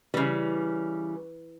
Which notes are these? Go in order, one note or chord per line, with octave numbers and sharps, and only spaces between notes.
C#3 E3 G3